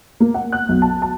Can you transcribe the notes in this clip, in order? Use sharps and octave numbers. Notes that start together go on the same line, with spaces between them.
A#3
F#5
F#6
B1
A5
A5